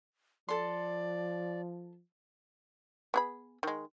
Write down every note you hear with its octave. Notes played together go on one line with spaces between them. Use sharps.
F3 A4 D5 C6
B3 G#4 B5
D#3 G#3